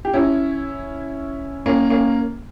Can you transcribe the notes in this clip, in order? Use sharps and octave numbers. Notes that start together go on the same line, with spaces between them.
G4
C#4 E4
A#3 C#4
A#3 C#4